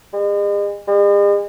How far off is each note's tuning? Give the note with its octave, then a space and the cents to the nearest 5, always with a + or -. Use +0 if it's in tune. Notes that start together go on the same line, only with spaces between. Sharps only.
G#3 -45
G#3 -45